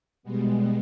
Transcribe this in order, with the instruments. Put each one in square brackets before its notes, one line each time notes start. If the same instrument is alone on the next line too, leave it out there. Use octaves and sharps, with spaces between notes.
[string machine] B2 G3 G#3 B3